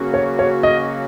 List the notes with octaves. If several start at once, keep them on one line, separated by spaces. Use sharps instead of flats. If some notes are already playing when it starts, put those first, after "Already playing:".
Already playing: C#3 F#3 A#3 C#4 F#4
C#5
C#5
D#5